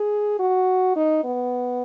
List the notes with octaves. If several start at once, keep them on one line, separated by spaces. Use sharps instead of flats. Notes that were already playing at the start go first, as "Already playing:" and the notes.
Already playing: G#4
F#4
D#4
B3